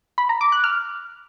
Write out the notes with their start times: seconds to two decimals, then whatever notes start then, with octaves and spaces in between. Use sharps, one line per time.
0.18 B5
0.29 A#5
0.41 D6
0.52 F#6
0.64 F6